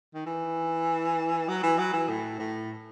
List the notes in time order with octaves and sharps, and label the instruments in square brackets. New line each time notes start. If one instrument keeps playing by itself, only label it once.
[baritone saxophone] D#3
E3
F#3
E3
F#3
E3
A2
A2